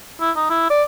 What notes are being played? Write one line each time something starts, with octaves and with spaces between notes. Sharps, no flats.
E4
D#4
E4
D5